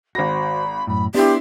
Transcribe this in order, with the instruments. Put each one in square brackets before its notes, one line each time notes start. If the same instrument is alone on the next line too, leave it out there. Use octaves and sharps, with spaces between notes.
[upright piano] G#1 A#6 [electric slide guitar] F#4 C5 [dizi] B5
[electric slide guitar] F#2 A2 [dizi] B5
[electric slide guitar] B3 [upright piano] D4 E4 [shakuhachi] G4 [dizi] C6